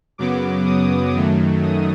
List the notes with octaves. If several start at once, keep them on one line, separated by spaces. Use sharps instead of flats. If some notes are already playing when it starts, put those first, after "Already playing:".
F#2 C#3 F#3 B3 D6
D#6
F#2 D#3 F#3 A3
D#6